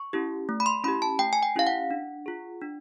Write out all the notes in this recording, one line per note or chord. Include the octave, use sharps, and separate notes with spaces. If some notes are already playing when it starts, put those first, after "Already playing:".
Already playing: C#6
C#4 E4 G4
A3
B5
C6
C#4 E4 G4 B5
A5
A3 G5
G#5
G5
C#4 E4 G4 F5
F#5
D4
F4 G#4
D4